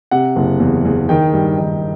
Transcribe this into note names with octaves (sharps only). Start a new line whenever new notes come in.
C3 F#5
F#1
E2
E2
D#3 G5
G2
D#3